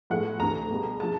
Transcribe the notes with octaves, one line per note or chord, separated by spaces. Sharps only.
A2 F3 G#3 B3 F#5
D2 C3 E3 A#5
C#2 B2 G3 B3
C#3 F3 A5